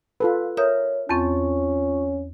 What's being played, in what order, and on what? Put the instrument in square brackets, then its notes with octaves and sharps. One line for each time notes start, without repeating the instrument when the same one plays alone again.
[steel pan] F4 A4 B4
[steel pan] A#4 [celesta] C#5 [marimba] E5 D#6 G6
[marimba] E2 C4 [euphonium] C#4 [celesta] F4 C#6 [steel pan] A5